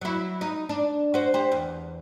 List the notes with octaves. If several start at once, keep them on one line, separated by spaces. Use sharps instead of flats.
F#3 E4
D#4
D4
F#4 C5
G4 C5
E2